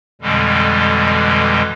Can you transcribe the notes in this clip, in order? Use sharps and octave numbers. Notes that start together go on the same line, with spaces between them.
F2 B2 D3 E3 G3 G#3